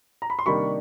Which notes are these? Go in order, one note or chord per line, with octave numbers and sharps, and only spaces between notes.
A#5
B5
C6
C3 D#3 G3 A#3 D4 B5 C#6